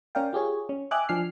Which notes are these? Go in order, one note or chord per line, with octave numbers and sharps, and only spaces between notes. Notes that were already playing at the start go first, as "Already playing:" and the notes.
C#4 A#4 D5 F5 G5
F4 G4 G#4 C#5
C#4
D#5 E5 G5 G#5 D6 F#6
F3 D4 G#5 F6 C7